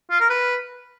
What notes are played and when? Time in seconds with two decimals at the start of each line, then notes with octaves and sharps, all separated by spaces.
0.10 F4
0.20 A#4
0.30 B4